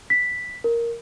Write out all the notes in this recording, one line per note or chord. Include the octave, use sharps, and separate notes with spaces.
B6
A#4